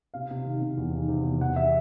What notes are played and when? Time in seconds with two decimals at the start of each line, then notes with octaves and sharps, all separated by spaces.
0.14 C3 F5
0.31 C3
0.46 D#3
0.62 C3
0.77 E2
0.94 D#3
1.09 C3
1.25 E2
1.41 E2 F#5
1.56 E5